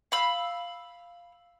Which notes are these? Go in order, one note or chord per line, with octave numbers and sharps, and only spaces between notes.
F5 B5 E6